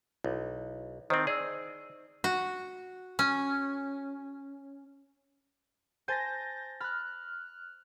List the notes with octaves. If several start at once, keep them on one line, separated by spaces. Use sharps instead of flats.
B1 E4
D#3 C4 D#4 C5 D#5
G#4 D5 E6
F#4
C#4
C5 G#5 A5 G6 A6 A#6
B5 F6 F#6 A6